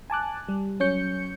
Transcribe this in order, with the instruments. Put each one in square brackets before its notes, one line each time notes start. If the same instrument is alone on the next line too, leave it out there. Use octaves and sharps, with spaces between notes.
[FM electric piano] G#5 A5 D6 F#6
G3
F#3 C#4 C#5 G6 C#7